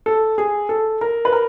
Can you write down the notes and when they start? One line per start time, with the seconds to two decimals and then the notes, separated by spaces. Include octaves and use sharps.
0.06 A4
0.38 G#4
0.69 A4
1.01 A#4
1.25 B4
1.33 A#4